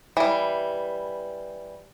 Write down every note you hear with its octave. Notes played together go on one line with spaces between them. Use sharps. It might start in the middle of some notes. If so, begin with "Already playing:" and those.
E3 G3